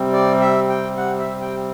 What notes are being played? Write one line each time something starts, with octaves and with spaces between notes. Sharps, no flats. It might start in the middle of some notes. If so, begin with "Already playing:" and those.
Already playing: C3 G3 C4
D5
E5
G5
F#5
E5
G5